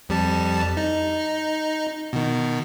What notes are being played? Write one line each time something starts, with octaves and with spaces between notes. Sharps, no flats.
F2 G3 A5
D#4
B2 D#3